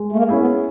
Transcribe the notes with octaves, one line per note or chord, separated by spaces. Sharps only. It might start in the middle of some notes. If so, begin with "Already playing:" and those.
Already playing: G#3
A3
A#3
C#4 E4 G#4
B3